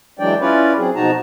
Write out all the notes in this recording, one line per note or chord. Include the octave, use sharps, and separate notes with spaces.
E3 F#3 G#3 D4 D5 G5
C#4 E4 F4 B4 C#5 D5
F#3 C4 G#4
B2 F3 D#4 F#4 A5 A#5